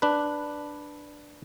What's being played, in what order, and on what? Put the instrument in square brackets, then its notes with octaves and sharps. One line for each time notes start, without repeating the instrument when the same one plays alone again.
[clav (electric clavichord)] D4 B4